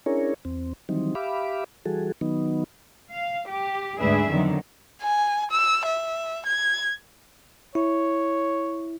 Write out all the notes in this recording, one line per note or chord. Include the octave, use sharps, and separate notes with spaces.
C#4 D4 E4 G#4 A#4 C#5
E2 C4
D#3 E3 F#3 G3 C4 D#4
G4 E5 F5 B5 D6
E3 G3 F#4 G#4 A4
D#3 F#3 B3 D#4
F5
G4
D2 G#2 D4 G#4 B4 E5
F2 D3 D#3 F#3 B3
G#5
E6
E5
G#6
E4 C#5